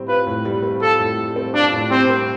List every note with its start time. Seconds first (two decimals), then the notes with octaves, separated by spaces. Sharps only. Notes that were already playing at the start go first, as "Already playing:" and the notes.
Already playing: A2 G3 C4
0.08 F4 B4
0.27 A2
0.45 G3
0.63 C4
0.82 F4 A4
1.00 A2
1.18 G3
1.36 C4
1.55 D4 F4
1.73 A2
1.91 G3 C4
2.10 C4